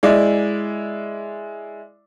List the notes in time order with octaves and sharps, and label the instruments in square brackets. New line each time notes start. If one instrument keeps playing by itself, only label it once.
[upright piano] G#3 E4 D5